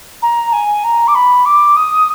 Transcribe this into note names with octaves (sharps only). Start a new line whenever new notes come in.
A#5
G#5
A#5
D6
B5
D6
D#6